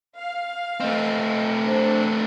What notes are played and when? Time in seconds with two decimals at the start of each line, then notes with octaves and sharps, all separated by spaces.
0.18 F5
0.80 A3 C4 D#5
1.66 D4 C5